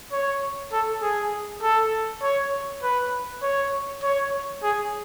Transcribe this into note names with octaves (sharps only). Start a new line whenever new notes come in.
C#5
A4
G#4
A4
C#5
B4
C#5
C#5
G#4